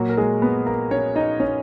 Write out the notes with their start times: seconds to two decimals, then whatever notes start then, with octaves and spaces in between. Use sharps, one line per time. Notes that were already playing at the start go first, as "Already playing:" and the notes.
Already playing: A#2 F#3 A#3 F#4
0.09 A#4
0.17 G#3 G#4
0.42 B3 B4
0.66 A#3 A#4
0.91 C#4 C#5
1.16 D#4 D#5
1.40 C#4 C#5